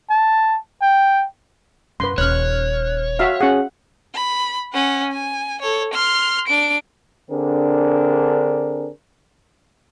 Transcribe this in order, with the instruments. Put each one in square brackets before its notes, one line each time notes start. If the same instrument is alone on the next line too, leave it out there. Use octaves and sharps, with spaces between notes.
[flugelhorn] A5
G5
[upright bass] F#2 [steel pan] B4 C6
[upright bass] D#1 C#4 [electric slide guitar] C#5 [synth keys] F6 F#6
[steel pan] F#4 E5 F5
[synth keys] C#4 F#4 G#4 [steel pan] F#5
[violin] B5
C#4 F#5
G#5
A4 C#5
C6 F6
D4 D7
[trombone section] D3 C4 D4 G#4 A#4